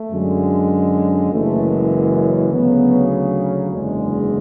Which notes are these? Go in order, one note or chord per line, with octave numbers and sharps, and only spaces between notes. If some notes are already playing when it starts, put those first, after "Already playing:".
Already playing: A3
F#2 D3 G#3
F#1 F#2 E3 G#3 A3
D2 C#3 F#3 B3
F#1 E2 D3 G#3